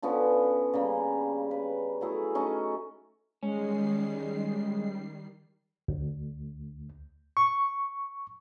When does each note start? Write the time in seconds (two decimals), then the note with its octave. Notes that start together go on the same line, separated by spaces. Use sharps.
0.02 D3 F3 B3 C#4
0.73 C#3 G3 A#3
1.51 B4
2.01 F#3 A3 E4 G#4
2.35 A3 C#4 D#4 G#5
3.43 D#3 G3 G#3 C#4 C7
5.88 D2
7.37 C#6